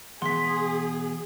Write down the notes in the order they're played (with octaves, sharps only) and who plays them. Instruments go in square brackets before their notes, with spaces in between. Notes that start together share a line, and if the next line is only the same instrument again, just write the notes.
[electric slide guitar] B2 E3 F#5 [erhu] G#4 [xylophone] C6 B6